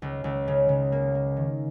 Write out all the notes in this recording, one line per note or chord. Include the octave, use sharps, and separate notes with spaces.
C#2
C#2
C#3
C#3
A#3
A#3
D#3